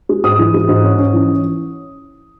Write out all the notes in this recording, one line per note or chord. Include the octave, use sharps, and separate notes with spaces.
G#3
G#2 D#6
E3
G#3
G#2
C#4
C#4
E3